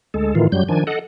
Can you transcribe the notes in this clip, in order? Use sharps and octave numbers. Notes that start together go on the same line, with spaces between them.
D2 G#3 A4
A2 D#3 E3 F4
F#2 F#3 G3 G6
D#3 F3 D4 G#5
A4 D#5 F#5